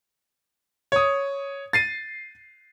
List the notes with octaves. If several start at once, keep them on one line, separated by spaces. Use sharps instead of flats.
C#5 D#6
A6 C7 D#7